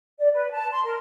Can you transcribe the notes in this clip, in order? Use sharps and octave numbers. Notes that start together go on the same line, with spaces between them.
D5
B4
A5
C6
A#4